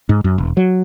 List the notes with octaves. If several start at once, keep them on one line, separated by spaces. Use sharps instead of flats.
G#2
F#2
E1
F#3